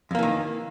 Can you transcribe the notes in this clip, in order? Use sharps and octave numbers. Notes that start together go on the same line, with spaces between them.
F2 D#3 E3 A#3